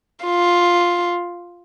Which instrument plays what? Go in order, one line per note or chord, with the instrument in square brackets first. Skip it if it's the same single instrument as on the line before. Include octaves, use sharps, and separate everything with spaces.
[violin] F4